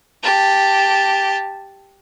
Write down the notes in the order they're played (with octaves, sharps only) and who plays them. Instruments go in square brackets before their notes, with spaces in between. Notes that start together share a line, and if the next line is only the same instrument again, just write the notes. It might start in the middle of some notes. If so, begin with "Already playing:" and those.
[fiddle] G4 A5